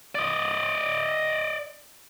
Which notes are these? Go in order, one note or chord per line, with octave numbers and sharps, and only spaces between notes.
D5 D#5